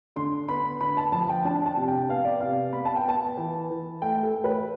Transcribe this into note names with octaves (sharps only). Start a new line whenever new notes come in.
D3 C6
B3 B5
D3 B5
A5
F3 A5
G5
D4 A5
A5
C3
G5
B3 F5
D5
C3 F5
B3 B5
A5
G5
B3 A5
E3
E3
A3 G5
A4
A3
B4